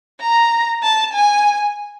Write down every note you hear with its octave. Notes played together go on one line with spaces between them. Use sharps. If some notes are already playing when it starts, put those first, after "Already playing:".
A#5
A5
G#5